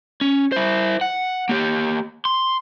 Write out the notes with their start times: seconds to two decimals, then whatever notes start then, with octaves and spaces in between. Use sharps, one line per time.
0.21 C#4
0.52 E4 C5
1.01 F#5
1.49 A#3 G4
2.25 C6